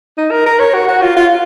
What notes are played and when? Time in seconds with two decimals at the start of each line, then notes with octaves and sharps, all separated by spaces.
0.18 D#4
0.31 A#4
0.46 A#4
0.60 C#5
0.74 F#4
0.88 F#4
1.02 F4
1.16 F4